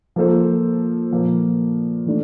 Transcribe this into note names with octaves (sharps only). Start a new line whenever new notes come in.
F3 A#3 F4 A4 C5
A#2 F3 A#3
E3 A3 D4